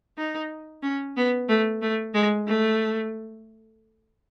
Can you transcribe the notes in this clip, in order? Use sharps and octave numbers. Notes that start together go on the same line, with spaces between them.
D#4
C#4
B3
A3
A3
G#3
A3